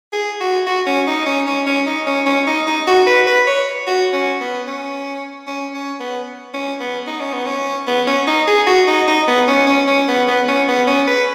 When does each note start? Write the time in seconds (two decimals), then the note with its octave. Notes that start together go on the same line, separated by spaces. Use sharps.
0.13 G#4
0.40 F#4
0.67 F#4
0.86 C#4
1.07 D#4
1.26 C#4
1.47 C#4
1.67 C#4
1.86 D#4
2.07 C#4
2.26 C#4
2.47 D#4
2.67 D#4
2.87 F#4
3.07 B4
3.27 B4
3.47 C#5
3.87 F#4
4.13 C#4
4.40 B3
4.67 C#4
5.47 C#4
5.74 C#4
6.00 B3
6.54 C#4
6.80 B3
7.07 D#4
7.20 C#4
7.33 B3
7.46 C#4
7.87 B3
8.07 C#4
8.27 D#4
8.47 G#4
8.67 F#4
8.87 D#4
9.08 D#4
9.27 B3
9.48 C#4
9.67 C#4
9.88 C#4
10.08 B3
10.28 B3
10.48 C#4
10.68 B3
10.87 C#4
11.08 B4